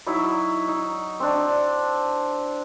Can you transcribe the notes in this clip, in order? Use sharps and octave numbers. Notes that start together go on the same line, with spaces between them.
F#3 D#4 E4
D#4
C4 D4